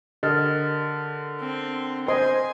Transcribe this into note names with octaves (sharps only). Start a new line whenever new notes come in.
D3 G4 A#4 D#5 F6 A6
C4
C5 D#5 G#5 C6